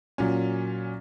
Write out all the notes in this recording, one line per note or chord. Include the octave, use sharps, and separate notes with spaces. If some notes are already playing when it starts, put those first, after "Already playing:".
A#2 F#3 C#4